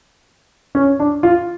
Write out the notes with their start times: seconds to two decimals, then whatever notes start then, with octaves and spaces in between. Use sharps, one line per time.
0.75 C#4
1.00 D4
1.23 F4